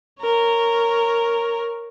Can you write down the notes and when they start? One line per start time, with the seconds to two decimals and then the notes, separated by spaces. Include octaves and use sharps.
0.22 A#4 C#5